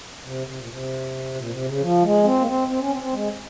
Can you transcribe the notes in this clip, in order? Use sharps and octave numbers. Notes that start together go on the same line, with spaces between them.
C3
C3
A#2
C3
A#2
C3
C#3
F3
G#3
C4
A#3
C4
C4
C#4
C4
C4
G#3